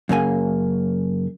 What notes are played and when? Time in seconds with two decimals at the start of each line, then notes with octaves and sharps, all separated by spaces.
0.09 F#2 C#3 A#3 G#5